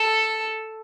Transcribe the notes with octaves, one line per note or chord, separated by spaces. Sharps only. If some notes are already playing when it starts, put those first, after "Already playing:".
Already playing: A4